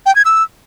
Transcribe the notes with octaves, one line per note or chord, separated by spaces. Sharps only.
G5
G#6
E6